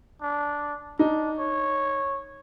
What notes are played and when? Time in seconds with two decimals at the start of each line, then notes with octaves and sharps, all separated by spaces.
0.22 D4
0.99 D4 D#4
1.39 C#5